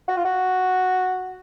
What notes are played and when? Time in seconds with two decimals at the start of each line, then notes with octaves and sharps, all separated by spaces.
0.08 F#4
0.17 F4
0.25 F#4